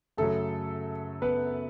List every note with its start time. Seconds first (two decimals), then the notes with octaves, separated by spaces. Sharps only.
0.17 F#2 C#3 F#3 A3 A4
1.22 B3 B4